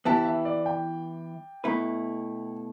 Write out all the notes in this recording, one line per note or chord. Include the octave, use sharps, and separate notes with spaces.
E3 B3 E4 G4 A5
E5
D5
G5
B2 A3 E4 B4